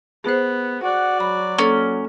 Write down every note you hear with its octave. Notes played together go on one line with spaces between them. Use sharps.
B3 G#4 C5
F#4 D5 F#5
F#3 B5
A#3 C#4 A4